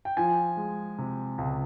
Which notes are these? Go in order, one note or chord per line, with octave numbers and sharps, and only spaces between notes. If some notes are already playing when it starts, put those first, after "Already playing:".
G5
F3 G#5
G#3
C3
C#2